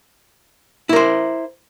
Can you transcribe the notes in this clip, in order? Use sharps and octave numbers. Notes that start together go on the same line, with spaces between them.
E4 A#4 C5